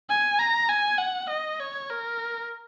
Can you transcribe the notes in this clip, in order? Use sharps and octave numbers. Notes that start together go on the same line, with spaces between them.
G#5
A#5
G#5
F#5
D#5
C#5
A#4